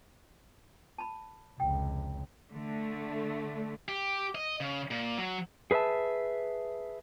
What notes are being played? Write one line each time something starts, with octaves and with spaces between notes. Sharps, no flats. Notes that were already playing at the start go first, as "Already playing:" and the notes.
A5 B5
F1 C#2 G5
D3 A3
G4
D#5
C#3
A#2
F#3
G#4 B4 C5 E5 A5